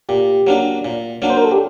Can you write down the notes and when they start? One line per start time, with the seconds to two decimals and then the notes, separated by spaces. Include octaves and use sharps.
0.09 A#2 G4
0.47 F#3 A#3 D4
0.85 A#2
1.22 F#3 A#3 D4
1.30 C5
1.38 A#4
1.44 A4
1.51 G4